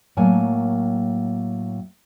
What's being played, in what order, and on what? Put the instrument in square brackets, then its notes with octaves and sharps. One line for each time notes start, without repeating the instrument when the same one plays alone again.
[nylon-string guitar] A2 F#3 A#3 A#4 G#5 A5